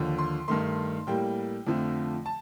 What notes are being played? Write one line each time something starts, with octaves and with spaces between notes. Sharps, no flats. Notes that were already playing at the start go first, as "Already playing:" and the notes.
Already playing: D#2 D3 F3
C6
G2 D#3 A3 C6
A2 G3 A#3 G5
F2 D3 F3 A3
A5